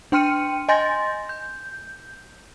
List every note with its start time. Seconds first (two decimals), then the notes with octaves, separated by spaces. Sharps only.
0.12 D4 G5 C6 F6 C#7 D#7
0.69 D#5 G#5 C6 G6 A6 A#6
1.29 G6